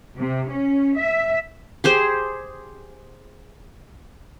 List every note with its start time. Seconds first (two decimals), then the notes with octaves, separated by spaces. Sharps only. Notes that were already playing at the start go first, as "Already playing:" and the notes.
0.19 C3
0.50 C#4
0.98 E5
1.84 G4 G#4 C5